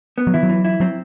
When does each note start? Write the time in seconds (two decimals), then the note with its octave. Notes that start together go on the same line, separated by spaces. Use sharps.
0.18 B3
0.27 F#3
0.34 E3 E4
0.43 F#3
0.49 E3
0.65 E4
0.80 F#3 C4